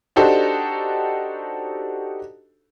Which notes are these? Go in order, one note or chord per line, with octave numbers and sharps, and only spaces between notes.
D4 D#4 F#4 G4 A4 C5